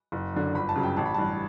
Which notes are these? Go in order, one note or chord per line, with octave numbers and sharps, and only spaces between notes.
F#1
F#2 D3
G1 B5
A5
F#2 C#3 F#3
G5
A1 A5
B5
G2 E3 A5